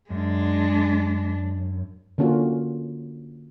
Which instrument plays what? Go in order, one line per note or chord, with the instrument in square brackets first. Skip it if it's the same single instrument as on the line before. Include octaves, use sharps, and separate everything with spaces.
[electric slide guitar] F#2 [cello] G#3 D4
[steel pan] D3 A#3 C#4 F4 F#4